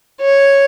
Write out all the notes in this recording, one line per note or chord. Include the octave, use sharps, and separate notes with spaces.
C#5